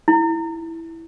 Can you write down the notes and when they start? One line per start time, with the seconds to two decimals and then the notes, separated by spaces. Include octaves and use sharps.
0.08 E4